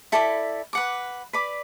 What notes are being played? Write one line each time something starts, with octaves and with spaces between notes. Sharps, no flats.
E4 A4 D5 B5
B4 F#5 D6
B4 D5 B5 D6